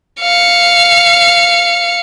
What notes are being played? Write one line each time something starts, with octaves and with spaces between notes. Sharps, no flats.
F5 C#7